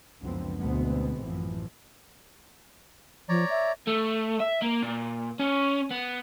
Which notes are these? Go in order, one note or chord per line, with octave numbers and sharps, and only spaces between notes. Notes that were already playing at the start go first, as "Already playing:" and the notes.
C#2 F#2 D3 F3 B3 C4
D2 B2 G#3 B3 C4
A1 F#2 E3 F3
F3 C#5 D5 A#5
E5
A3
E5
A#3
A#2
C#4
B3